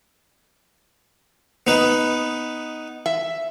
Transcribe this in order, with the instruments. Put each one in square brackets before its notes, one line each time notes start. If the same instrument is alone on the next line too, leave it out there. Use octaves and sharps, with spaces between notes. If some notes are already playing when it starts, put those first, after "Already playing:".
[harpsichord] B3 D#4 B4
[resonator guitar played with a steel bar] E5